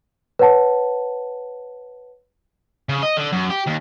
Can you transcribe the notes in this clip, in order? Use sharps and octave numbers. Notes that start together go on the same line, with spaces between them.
B4 C#5 F#5 A5
C#3
D#5
D3
F#2
G4
D#2